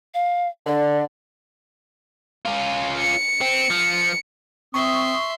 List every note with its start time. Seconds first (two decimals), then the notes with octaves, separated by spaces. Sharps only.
0.14 F5
0.67 D3 D5
2.46 C#4 F4
2.98 C#7
3.41 C4
3.70 F3
4.74 C4 E5 C6 C#6 D#6